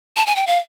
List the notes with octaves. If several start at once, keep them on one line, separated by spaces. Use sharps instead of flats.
A5
G#5
G5
F5